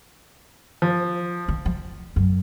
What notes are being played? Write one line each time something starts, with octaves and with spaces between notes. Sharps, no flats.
F3
D#3
F3
F#2